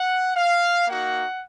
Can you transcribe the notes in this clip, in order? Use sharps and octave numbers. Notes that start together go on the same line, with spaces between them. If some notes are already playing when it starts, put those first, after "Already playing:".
Already playing: F#5
F5
A#3 D#4 F#4 F#5